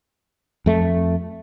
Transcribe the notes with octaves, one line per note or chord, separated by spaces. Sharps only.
F2 A3